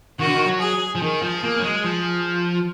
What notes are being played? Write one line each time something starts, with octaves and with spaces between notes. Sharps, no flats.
D#3 F#4
D3
D#3
F#3
G#4
F3
D#3 G#4
F3
A#3
F#3
G#3
F3